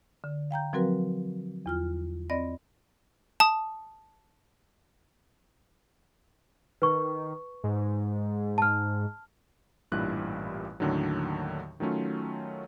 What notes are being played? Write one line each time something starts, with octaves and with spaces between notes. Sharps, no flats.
D3
F5 G5 A#5 G6
F3 F#3 C4 F#4 A#4 B4
E2 F4 F6
C4 D5 D#5 B5 A#6
A5 D#6
D#3 B4 C#6
G#2
A5 F6
A1 G2 A#2 G3 E4 F#6
D#2 A2 D3 D#3 F#3
D#3 F#3 A3 C#4 F4